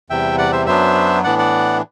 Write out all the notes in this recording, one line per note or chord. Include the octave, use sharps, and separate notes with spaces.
E2 C3 G3 E5 G5
D5 F#5
C5 E5
F#2 F#3 B3 D4 C5 E5
A2 E3 B3 D4 D5 F#5
D5 F#5